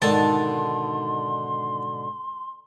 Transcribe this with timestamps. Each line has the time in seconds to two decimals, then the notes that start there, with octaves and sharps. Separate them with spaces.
0.02 G#2 B2 D3 D#3 D4 A4 A5 C6